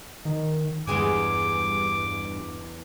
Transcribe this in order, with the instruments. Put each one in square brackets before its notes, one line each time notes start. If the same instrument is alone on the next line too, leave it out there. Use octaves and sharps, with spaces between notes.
[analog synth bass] D#3
[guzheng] E2 G#3 G#5 [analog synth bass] G2 [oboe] D6